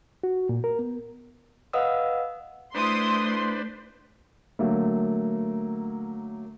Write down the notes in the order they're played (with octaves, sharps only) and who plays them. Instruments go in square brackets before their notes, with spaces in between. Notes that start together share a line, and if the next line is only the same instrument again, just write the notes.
[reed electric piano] F#4
A#2
A#4
B3
[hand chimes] B4 D#5 F5 F#5 D#6 E6
[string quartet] A3 [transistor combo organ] D4 B4 C5 [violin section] E4 D#6 [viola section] C6
[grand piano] D3 F#3 A3 A#3